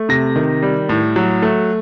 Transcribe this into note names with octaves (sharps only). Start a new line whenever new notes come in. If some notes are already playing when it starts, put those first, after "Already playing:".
Already playing: A3
C3 A#6
D#3
G3
A2
F#3
A3